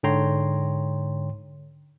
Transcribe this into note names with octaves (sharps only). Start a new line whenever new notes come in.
G#2 D3 C#5 G5 A#5 C6